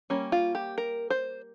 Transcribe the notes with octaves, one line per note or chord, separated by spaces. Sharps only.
G3 A#3 C#4
F4
G4
A#4
C5